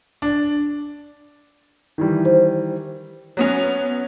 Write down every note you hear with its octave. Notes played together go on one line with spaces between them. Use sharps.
D4
D#3 E3 G3
C5
F#3 B3 C#4